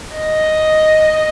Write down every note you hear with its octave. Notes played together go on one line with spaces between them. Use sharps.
D#5